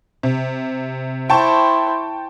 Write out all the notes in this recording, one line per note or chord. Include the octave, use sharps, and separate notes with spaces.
C3
E4 C5 G5 A5 C#6